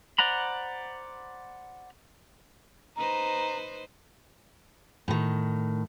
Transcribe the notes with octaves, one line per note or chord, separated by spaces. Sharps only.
C5 D5 F#5 A#5 B5
D#4 B4 C5 A#5
A2 D#3